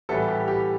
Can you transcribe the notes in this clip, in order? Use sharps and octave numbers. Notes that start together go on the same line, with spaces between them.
A2 E3 G3 B3 A4
G4
G4